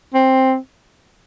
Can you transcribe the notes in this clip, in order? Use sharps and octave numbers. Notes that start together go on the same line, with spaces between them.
C4